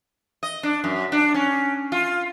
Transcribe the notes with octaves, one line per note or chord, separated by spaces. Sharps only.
D#5
D4
F#2
D4
C#4
F4